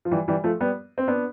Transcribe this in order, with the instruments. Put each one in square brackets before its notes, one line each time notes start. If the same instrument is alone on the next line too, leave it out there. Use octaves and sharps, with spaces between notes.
[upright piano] F3
E3 G3
E3 G3
F3 A3
G3 B3
C4
B3 D4